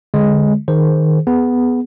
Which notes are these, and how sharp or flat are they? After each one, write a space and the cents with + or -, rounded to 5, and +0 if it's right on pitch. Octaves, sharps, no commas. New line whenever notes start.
D3 +0 G#3 +0
D#3 +0 G#4 +20 C5 +0
B3 +0 G#4 +0